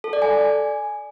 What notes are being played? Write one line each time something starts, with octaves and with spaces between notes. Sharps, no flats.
A4
D5
G#5